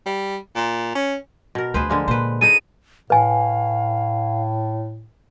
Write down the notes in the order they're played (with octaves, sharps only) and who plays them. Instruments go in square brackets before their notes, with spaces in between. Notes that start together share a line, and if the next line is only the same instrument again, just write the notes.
[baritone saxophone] G3
A#2
C#4
[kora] B2 A#4
[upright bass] D2 F3 [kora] G#4 B4 C5
[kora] D3 G#3 A#3
[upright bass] A#2 [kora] B4 C5
[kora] D#4 G#4 A4 [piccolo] D#7
[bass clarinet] A2 [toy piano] B4 G#5 [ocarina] F5